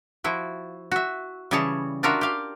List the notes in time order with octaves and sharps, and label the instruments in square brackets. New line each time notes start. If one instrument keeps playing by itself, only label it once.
[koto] F3 E4 F#4
F#4 E5
C#3 E3 G3 G#4 C#5 A5
D4 F4 F#4 A#4 E5 F5
G4 F5